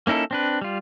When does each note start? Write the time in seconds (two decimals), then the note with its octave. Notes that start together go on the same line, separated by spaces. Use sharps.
0.07 A#3 C#4 D#4 E4 A4
0.31 C4 D4 B4
0.61 G3 F4